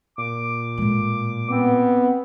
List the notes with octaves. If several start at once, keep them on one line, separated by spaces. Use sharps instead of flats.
A#2 D6
A2 G#3
B3 C4